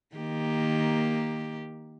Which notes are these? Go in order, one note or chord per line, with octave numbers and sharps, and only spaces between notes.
D#3 A#3 G4